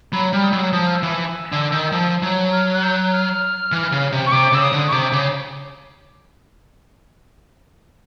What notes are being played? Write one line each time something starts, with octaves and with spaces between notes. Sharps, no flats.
F#3 B5
G3 F6
D#6
F#3 E6
F3 D#6
F6
E6
E3
E6
D3
D#3
F3
F#3
F6
F#6
G6
F#6
F6
E3
C#3
C3
C#6
C3 D6
C#3 E6
D#6
D3
C#6
C3 D6
C#3